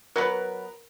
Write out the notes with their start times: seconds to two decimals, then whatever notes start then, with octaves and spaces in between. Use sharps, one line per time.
0.16 F#3 B3 A#4 B4